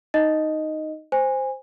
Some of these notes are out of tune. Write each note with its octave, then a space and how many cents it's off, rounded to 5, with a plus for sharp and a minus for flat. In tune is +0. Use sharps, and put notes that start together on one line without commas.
D#4 +0 D#5 +0
C5 +0 G#5 -20